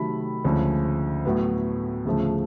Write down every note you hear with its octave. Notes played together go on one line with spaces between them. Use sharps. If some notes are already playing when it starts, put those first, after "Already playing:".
Already playing: C3 D#3 F#3 A3 B5
D2 C#3 F3 G#3 C#4
A2 F#3 B3
D2 C#3 F3 A3